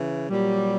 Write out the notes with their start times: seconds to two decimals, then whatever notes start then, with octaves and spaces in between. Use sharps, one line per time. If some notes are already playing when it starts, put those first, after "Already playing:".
Already playing: C#3 E3
0.29 A#2 F#3 G3